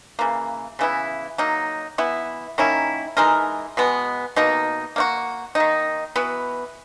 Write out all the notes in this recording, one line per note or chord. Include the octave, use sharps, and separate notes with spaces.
C#3 E3 A#3
C#3 E3 B3 E4
F#3 A#3 D#4
E3 B3 E4
D#3 A#3 C#4 E4
E3 G#3 D#4 A#4
B2 G#3 B3
B2 A#3 D#4
A#3 D#4 F#4
D#3 A#3 D#4
E3 B3 F#4 B4